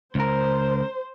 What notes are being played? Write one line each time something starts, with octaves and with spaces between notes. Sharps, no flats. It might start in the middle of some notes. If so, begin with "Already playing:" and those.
C#2 A#4 C5